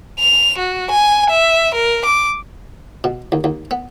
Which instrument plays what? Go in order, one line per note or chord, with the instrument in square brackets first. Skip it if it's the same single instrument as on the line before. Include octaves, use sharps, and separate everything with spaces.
[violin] F7
F#4
G#5
E5
A#4
D6
[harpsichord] B2
D#2
D#2
B3